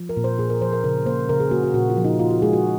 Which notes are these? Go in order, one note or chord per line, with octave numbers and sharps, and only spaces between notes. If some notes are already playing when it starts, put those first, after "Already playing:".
Already playing: F3
A#4
A#2
C5
A#2 G#4
A#4
F3 C5
A#4
C#3 A#4
A#3 C5
C#3 A#4
G#4
A#3 F#4
F#4
A#2 F#4
F4
F3
D#4
A#2 F4
F#4
G#3 G#4
F#4